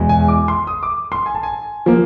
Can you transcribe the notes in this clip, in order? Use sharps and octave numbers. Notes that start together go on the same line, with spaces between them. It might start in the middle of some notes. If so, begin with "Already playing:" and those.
Already playing: E2 B2 G#3
G#5
D6
C6
D#6
D6
C6
G#5
A5
G#5
F3 A#3